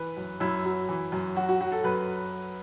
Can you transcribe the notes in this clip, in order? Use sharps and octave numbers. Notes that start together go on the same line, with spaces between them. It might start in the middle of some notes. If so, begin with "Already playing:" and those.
Already playing: E3 B4
F#2
F#2 E4
F#3
E3
F#2
F#3 F#4
F#4
F#3 F#4
A4
F#2 B4